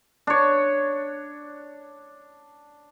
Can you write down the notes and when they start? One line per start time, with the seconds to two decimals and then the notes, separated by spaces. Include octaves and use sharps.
0.27 D4 C#5